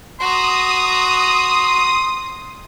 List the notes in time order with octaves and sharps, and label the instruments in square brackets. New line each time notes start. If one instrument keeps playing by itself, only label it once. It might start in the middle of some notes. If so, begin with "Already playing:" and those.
[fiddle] F#4 A#5 [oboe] C6 [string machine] D#6